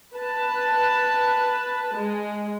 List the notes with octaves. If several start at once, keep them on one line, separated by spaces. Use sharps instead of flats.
B4 A5
G#3